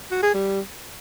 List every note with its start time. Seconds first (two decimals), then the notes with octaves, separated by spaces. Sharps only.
0.11 F#4
0.23 G#4
0.34 G3